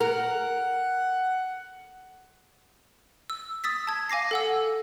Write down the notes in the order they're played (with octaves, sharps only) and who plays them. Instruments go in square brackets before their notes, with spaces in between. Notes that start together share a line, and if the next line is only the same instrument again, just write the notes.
[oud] A#4 [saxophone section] F#5
[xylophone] E6
D#6 E6 A6 B6
A5 G#6
F5 G#5 D6 A#6 C7
A4 F#5 E6